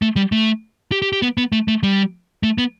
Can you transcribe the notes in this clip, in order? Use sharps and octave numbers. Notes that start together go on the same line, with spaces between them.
A3
G3
A3
G4
G4
G4
B3
B3
A3
A3
G3
A3
B3